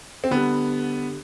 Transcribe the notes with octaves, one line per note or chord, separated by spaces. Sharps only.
C4
D3 G3 B3